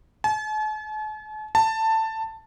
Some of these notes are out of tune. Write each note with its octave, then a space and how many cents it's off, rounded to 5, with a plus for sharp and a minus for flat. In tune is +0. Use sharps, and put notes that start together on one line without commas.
A5 -45
A5 +15